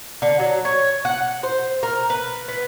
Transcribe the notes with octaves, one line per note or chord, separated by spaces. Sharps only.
D3
F#3
C#5
F#5
C5
A#4
B4
B3